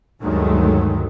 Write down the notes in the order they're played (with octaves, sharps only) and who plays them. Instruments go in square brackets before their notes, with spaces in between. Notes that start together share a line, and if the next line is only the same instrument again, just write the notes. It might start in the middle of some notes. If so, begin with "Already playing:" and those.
[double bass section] D2 G2 D#3 F#3 G#3 A3